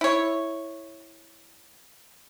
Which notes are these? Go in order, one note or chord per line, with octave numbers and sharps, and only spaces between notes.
E4 C#5